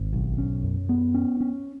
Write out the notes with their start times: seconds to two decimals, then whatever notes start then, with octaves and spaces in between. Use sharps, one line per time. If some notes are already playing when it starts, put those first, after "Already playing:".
Already playing: G#1
0.13 B1
0.38 C#4
0.64 F#2
0.89 B3
1.14 C#4
1.40 C#4